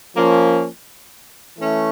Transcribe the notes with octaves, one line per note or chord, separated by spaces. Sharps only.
F3 A#3 C#4
E3 A3 C#4